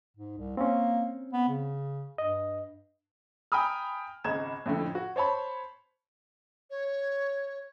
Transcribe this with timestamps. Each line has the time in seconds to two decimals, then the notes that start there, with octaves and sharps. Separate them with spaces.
0.17 G#2
0.38 C2
0.57 A#3 C4 C#4
1.33 B3
1.49 C#3
2.18 G2 D#5
3.52 G5 G#5 A#5 B5 D#6 F6
4.24 G#1 C#2 D#5 A#5 G#6 E7
4.66 F2 A2 D3
4.95 F#4
5.16 C5 C#5 A5 B5
6.70 C#5